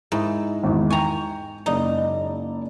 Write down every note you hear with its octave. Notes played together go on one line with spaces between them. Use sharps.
G#2 E4
G#1 E2
G5 G#5 A#5 C#6
F#1 D#4 D5